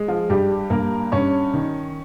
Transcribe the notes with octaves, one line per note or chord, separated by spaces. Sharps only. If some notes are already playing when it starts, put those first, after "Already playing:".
Already playing: G#3
F3 F4
G2 G3 G4
G2 A#3 A#4
G2 C#4 C#5
D#3